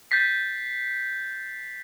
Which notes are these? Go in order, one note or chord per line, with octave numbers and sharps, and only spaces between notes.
G6 A6 B6 C7